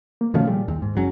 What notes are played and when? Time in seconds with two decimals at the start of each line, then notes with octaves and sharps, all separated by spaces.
0.21 A#3
0.34 B2 D#3 F3 A3 C#4 F5
0.47 A#2 G3 G#4
0.68 D#2
0.82 G#2
0.95 F#1 F#3 C#4